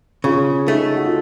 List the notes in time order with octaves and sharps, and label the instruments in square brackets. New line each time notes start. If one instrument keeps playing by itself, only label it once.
[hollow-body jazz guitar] C#3 [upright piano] F4
[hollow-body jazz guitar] A3 [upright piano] D#4
[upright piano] F#4
F4